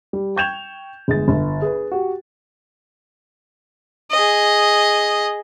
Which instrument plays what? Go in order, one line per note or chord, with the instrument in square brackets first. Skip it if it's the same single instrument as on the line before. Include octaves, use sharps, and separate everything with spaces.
[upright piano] G3
G5 C#6 G6 G#6 E7 F7
G1 G#3 G#4 A6
G1
G#4 B4
F#4 G4
[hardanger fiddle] G#4 D#5